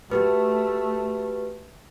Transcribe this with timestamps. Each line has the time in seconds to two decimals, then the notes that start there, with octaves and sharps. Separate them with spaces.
0.11 A3 F#4 G4 B4